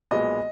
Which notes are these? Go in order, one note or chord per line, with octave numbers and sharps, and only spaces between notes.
B1 A#2 G#3 B3 D#5